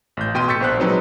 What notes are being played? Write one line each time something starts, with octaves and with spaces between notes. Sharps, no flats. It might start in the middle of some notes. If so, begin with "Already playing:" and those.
A1 G6
B2 G5 C6 D#7
C#6 E6 G6 A6 B6 C#7
A#1 C5 F#6
F#3 G#3 C4 D#4 B4